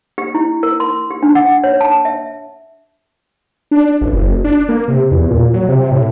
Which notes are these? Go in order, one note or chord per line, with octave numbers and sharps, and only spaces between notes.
G4
E4
A#4
C6
G4
D4
F#5
C#5
A5
E5
D4
A1
F#1
D4
A#3
C3
E2
A#2
F#3
C3
A2